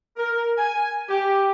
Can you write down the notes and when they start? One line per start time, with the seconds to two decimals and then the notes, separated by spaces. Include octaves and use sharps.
0.17 A#4
0.58 G#5
1.09 G4